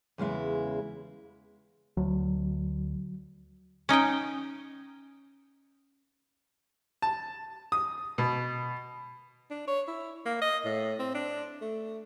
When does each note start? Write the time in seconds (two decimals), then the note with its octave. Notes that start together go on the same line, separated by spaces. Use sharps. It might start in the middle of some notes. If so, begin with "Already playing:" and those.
0.18 E2 C#3 G#3 E4
1.97 D2 F#3
3.89 C#4 D#4 D#5 G5
7.02 A5
7.72 D#6
8.18 B2
9.50 D4
9.68 C#5
9.88 E4
10.25 A#3
10.42 D#5
10.65 A2
10.99 C4
11.15 D4
11.61 A3